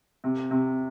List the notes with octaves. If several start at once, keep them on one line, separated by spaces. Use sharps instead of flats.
C3
C3